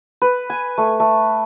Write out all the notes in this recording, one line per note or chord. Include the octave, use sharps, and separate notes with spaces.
B4
G#5
A3
A3